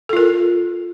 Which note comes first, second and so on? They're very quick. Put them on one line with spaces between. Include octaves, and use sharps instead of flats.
A4 F4 A#4